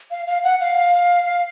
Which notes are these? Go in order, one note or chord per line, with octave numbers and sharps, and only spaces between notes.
F5
F5
F#5
F5